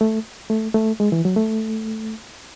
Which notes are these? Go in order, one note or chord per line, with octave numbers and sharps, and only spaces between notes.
A3
A3
A3
G#3
E3
F#3
A3